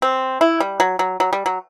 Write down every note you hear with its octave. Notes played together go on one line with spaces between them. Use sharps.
C4
E4
G3
F#3
F#3
F#3
G3
F#3